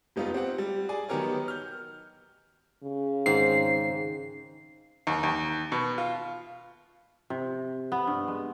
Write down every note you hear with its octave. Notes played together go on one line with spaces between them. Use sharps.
F1 G3 B3 D#4 F4
C4 G4 F#5
G3
G#4 D5 G#5
D#3 F#3 B3 G4 A#4 C#5
F6 G6
C#3
G#2 D#3 C4 C7
D#2
D#2
B2
F4
C3
B3
G2
G#3